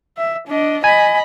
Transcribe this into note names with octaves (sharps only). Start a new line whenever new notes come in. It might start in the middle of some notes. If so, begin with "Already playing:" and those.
E5
D4 D#5
D#5 G#5 B5